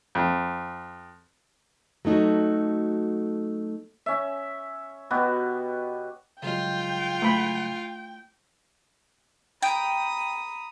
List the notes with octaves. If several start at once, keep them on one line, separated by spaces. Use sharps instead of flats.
F2
F#3 A3 D#4 F#4 A4
C#4 E5
B2 B3 F#4 G4
C#3 F#3 G#3 F4 G5
A3 B5
G5 A#5 B5 D#6